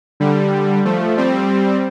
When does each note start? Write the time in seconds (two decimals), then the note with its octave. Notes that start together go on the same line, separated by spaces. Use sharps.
0.20 D3 G3
0.85 F3 A3
1.17 G3 C4